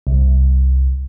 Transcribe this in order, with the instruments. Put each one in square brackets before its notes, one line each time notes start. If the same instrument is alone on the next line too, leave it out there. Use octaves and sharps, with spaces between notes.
[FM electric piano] C2